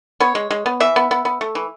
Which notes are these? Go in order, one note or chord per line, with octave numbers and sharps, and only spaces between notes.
B3 C#5
G#3
G#3
B3
E3 E5
B3
B3
B3
A3
E3